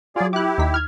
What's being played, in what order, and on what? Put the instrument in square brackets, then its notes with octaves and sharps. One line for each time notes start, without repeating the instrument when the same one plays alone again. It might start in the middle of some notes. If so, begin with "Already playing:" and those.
[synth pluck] F#3 F4 [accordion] G#4 D5
[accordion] E4 G4 [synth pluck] D6 F#6
[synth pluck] D#2 D#4 B6
F6 G#6